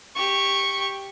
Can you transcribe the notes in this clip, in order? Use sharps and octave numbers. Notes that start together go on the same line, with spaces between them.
G4 C#6